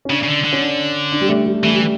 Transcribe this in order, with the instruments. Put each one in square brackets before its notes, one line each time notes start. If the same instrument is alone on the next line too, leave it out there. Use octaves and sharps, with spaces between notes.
[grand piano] C#4
[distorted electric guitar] C#3 [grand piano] D4
[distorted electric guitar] C#3
D3
D3
[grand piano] C#4
D4
D4
G3
A3
G3
[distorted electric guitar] E3 [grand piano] A3
[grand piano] G3